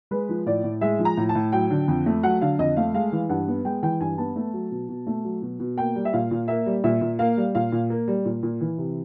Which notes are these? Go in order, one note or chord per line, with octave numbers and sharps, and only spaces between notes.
G#3 B4
F3
A2 D5
A2
G#3 E5
F3
A#5
A2
A5
A2
F#3 G5
D3
F2
A3
F#3 F#5
D3 F5
F2 D#5
A3 F5
G#3 F5
E3
G2 F#5
B3
G#3 G5
E3 G5
G2 G#5
B3 A5
A3
F#3
B2
B2
A3
F#3
B2
B2
A#3 G5
G3
E5
A#2 F5
A#2
A#3 E5
G3
A#2 E5
A#2
A#3 F5
G3
A#2 F5
A#2
A#3
G3
A#2
A#2
E3
C3